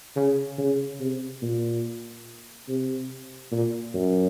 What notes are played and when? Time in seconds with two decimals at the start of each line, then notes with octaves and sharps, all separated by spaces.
0.16 C#3
0.58 C#3
1.00 C3
1.42 A#2
2.69 C3
3.52 A#2
3.94 F#2